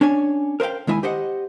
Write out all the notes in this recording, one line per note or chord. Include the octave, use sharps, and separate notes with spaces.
C#4 D4 C#5 G#5
A#4 C5 D#5 F5 G5
D#2 G#3 E4 E5 G#5
G4 C5 D#5 F#5